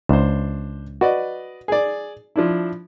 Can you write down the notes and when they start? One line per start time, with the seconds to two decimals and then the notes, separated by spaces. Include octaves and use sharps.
0.09 C#2 D4 C5
1.01 F#4 B4 D5 D#5
1.68 G#4 D5
2.36 F3 D4 E4